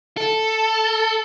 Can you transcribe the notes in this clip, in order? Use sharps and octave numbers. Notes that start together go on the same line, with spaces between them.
A4